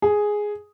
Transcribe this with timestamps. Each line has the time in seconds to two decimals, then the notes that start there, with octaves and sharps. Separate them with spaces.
0.02 G#4